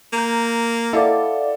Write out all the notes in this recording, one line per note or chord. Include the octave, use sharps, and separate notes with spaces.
A#3 A#5 G6
E4 A4 D5 D#5 F5 F#5